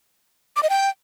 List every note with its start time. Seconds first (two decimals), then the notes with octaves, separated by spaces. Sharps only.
0.56 D6
0.63 D#5
0.70 G5